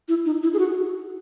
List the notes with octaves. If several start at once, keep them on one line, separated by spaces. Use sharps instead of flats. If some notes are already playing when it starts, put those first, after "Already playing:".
E4
D#4
E4
G#4
F#4